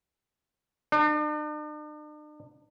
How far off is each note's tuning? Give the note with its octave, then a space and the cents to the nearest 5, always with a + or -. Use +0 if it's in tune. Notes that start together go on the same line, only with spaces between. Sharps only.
D4 +45